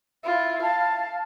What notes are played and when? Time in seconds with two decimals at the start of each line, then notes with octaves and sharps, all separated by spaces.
0.24 E4 F4
0.62 F5 A5